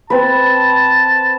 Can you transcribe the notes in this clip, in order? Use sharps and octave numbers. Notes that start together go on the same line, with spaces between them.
C4 B4 A5